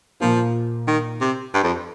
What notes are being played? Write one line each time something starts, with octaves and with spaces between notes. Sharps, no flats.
A#2 F3 A#3 F4
D#3
C3
G2
F2